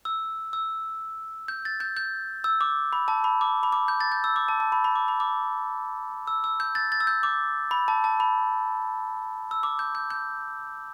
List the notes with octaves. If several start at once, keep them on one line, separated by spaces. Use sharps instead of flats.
E6
E6
G6
A6
G6
G6
E6
D6
B5
A5
B5
D6
B5
D6
G6
A6
G6
E6
D6
A5
A5
B5
B5
D6
B5
D6
E6
E6
G6
A6
A6
E6
G6
D6
B5
A5
A5
B5
E6
D6
G6
G6
G6